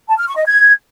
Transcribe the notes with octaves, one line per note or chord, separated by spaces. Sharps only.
A5
F6
C#6
D#5
G#6